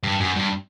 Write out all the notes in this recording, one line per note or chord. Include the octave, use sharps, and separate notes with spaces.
G2
F#2
G2